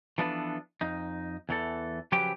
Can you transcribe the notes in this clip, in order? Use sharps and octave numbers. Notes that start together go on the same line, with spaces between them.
E3 F3 B3 D4 A4 B4
F2 D#4
E2 E3 A4
C#3 F3 F#3 G4 B4 G5